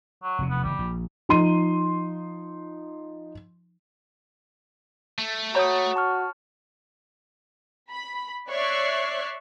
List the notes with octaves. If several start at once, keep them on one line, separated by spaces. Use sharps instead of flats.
F#3
F1 E2 C3
B3
F#1 E3 G3
A#1
F3 D#4 C6 D#7
A3
F#4 C#5 A#5 B5 D#6
A5 C#6 F6
B5
C#5 D5 E5 C#6 F#6 C7